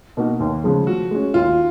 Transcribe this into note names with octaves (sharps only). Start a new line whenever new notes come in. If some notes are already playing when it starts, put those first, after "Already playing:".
B2 A#3 D#4 F#4
D#2
C#3 F3 G#3
F3 F#4
G#3 C#4
D#2 F4